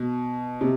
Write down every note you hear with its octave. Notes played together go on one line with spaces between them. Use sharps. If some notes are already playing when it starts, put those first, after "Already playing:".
Already playing: B2
C3